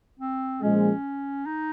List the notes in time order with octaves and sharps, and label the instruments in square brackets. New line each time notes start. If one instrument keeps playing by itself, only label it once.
[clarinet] C4
[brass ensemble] A#2 F3 G#3 [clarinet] C#4
[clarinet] D#4